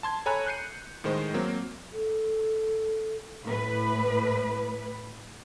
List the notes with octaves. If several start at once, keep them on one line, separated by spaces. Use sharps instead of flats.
A5 C6 G#6
A4 C#5 G#5 A#5 B5 F#6
F#6 G6 C7 C#7 D#7
A2 D#3 G#3 C5 D#5
F#3 A#3 C4
A4
A2 B4